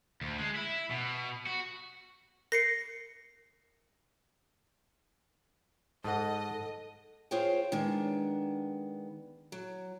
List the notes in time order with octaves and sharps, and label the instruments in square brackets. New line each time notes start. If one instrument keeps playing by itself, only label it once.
[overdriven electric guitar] D2
G#3
E4
B2
F#4
[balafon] A#4 [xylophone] A#6 C7 C#7
[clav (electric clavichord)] G#2 [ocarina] A4 [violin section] D#5 [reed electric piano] F#5 A5
[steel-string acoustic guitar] F4 G#4 C5 C#5 F5 G5
D#3 G#3 B3 D4
F#3